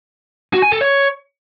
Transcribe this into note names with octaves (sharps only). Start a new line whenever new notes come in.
F#4
G#5
A4
C#5